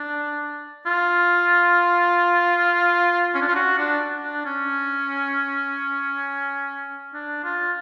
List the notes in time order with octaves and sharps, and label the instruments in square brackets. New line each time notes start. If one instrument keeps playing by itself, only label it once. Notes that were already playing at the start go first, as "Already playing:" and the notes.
Already playing: [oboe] D4
F4
C#4
D4
F4
F#4
D4
D4
C#4
D4
F4